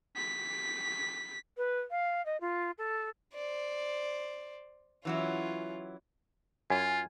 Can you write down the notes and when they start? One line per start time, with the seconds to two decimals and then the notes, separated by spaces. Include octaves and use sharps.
0.17 B6
1.57 B4
1.91 F5
2.26 D#5
2.41 F4
2.78 A4
3.34 C5 D5
5.05 E3 F#3 C#4 E4 F4
6.70 F#2 F4 G#5